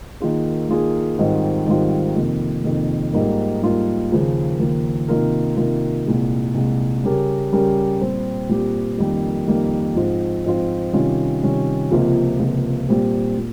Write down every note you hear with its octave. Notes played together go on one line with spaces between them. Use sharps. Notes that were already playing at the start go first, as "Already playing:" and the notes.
D#3 A#3 F4 G#4
D#3 A#3 F4 G#4
G#2 D#3 G3 C4 F4
G#2 D#3 G3 C4 F4
F2 C3 D#3 A#3
F2 C3 D#3 A#3
G#2 G3 A#3 F4 A#4
G#2 G3 A#3 F4 A#4
D#2 C#3 F3 A#3
D#2 C#3 F3 A#3
C3 D#3 A#3 F4 A#4
C3 D#3 A#3 F4 A#4
C2 A#2 G#3
C2 A#2 G#3
C#3 G3 C#4 G4 A#4
C#3 G3 C#4 G4 A#4
A#2 G3 C4 G4
A#2 G3 C4 G4
F2 D#3 G3 A#3
F2 D#3 G3 A#3
G#2 F3 C4 F4
G#2 F3 C4 F4
C3 D#3 G3 C#4 F4
C3 D#3 G3 C#4 F4
C#2 C3 F3 A#3 F4
C#2 C3 F3 A#3 F4
A#2 G3 C4 G4
A#2